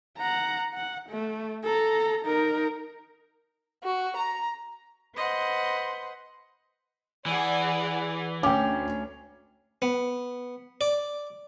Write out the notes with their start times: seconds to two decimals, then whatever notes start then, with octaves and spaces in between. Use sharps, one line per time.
0.18 F#5 A#5
0.74 F#5
1.09 A3
1.64 A4 A#5
2.25 D#4 A#4
3.83 F#4
4.15 A#5
5.15 B4 C5 D#5 F#5 C6
7.26 E3 G#4 D5 F#5
8.43 D2 C#4 G5 D6
9.82 B3
10.81 D5